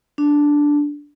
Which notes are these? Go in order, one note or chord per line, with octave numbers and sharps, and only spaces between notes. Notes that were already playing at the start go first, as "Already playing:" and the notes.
D4